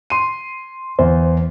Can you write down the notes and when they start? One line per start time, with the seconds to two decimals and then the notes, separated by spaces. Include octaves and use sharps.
0.10 C6 D#7
0.99 E2 C5